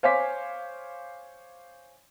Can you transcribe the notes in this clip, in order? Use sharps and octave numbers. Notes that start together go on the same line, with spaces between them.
C5 C#5 F5 G#5 D6 B6